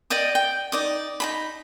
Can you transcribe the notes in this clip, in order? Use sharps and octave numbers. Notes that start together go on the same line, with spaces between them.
D5 D#5 G5 D#6
G5
D#4 D5 D#6
D#4 G#4 B5